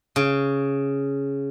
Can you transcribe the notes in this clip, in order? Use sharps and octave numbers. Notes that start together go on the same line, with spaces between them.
C#3